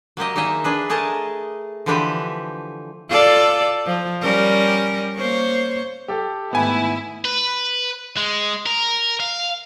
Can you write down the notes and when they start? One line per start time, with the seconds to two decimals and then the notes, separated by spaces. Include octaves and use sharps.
0.17 F#3 A#3 G4 D#5
0.36 D#3 A#3 D#4 G#4 D#5 E5
0.64 D4 G#4 B4
0.90 A3 G#4 A#4 D#5 A5
1.86 D3 E3 F3 G4 B4 E5
3.09 F4 A4 D5
3.86 F3
4.22 G3 C#4 A#4
5.17 A#3 C5 C#5
6.08 G4 A4
6.53 G#2 D#3 A3 B3 E4 G#5
7.25 B4
8.17 G#3
8.66 A#4
9.20 F5